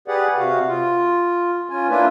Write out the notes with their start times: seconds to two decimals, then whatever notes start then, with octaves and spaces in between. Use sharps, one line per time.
0.08 G4 G#4 B4 D5 F#5
0.38 C3 F#4 F5
0.68 F4
1.70 C#4 F4 G#5
1.89 A#3 D4 E4 F4 B4